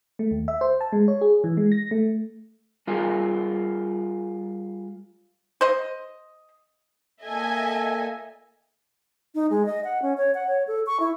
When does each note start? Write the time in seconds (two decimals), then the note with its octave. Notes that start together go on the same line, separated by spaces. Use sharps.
0.19 A3
0.31 D#2
0.48 E5
0.61 C5
0.81 A5
0.92 G#3
1.08 C#5
1.21 G#4
1.44 E3
1.57 G#3
1.72 A#6
1.91 A3
2.87 G3 F4 G#4 A#4
5.61 C5 D#5
7.23 A#2 A4 D#5 E5 G#5
9.35 D#4
9.50 G#3
9.66 D#5
9.84 F#5
10.02 C#4
10.17 C#5
10.35 F#5
10.47 C#5
10.67 A4
10.87 C#6
11.00 E4